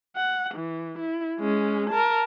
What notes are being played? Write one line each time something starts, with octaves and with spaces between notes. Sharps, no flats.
F#5
E3
E4
G#3 C#4
A#4 A5